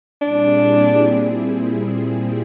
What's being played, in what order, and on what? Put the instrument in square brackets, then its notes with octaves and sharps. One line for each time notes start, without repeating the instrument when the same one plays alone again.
[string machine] A#2 G3 C4 E4 G#4 [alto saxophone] D4